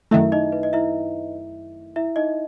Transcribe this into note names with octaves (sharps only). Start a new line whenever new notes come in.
F#2 D#3 A3 E4 E5
D#4 D#5
B4
D#5
E4 E5
E4 E5
D#4 D#5